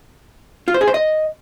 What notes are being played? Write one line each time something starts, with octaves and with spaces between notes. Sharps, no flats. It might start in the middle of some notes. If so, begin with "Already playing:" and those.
F4
C5
G#4
C5
D#5